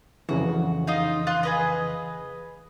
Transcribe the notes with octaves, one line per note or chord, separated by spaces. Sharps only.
F2 C#3 E3 F#4
D#4 F4 D#5
F4 C6 F#6
G#4 B4 D#5